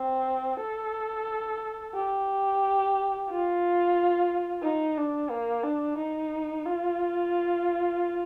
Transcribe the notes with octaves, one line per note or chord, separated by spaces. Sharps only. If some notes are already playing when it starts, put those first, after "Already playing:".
Already playing: C4
A4
G4
F4
D#4
D4
A#3
D4
D#4
F4